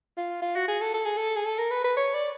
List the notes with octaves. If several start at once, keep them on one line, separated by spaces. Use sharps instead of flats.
F4
F4
F#4
G#4
A4
A4
G#4
A4
G#4
A4
A#4
B4
B4
C#5
D5